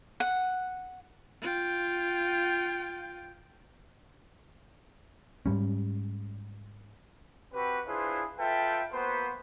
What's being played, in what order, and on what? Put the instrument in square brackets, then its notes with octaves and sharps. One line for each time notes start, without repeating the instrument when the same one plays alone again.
[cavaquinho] F#5
[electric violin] F4 G5
[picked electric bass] G#2 G3 C#4
[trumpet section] C4 F#4 G4 B4
D4 E4 F4 G#4 B4 C5
F4 A4 B4 E5 G5
A#3 B3 F#4 B4 C5